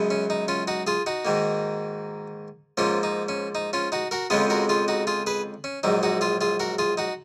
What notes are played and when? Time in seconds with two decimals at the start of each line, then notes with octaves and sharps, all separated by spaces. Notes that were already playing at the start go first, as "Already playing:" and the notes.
Already playing: F#2 C#3 G#3 B3
0.11 C#4
0.30 D#4
0.48 C#4 F4
0.68 D#4 F#4
0.87 F4 G#4
1.06 D#4 F#4
1.25 G#2 D#3 A#3
2.77 G#2 F3 A#3 C#4 F4
3.03 D#4
3.29 C#4
3.55 D#4
3.73 C#4 F4
3.92 D#4 F#4
4.11 F#4 A#4
4.30 F2 C#3 F3 G#3 B3 F4 G#4
4.50 F#4 A#4
4.69 F4 G#4
4.88 D#4 F#4
5.07 F4 G#4
5.27 G#4 B4
5.64 C#4
5.83 A#1 G#2 F#3 D#4
6.03 D#4 F#4
6.21 F4 G#4
6.41 F4 G#4
6.60 F#4 A#4
6.79 F4 G#4
6.97 D#4 F#4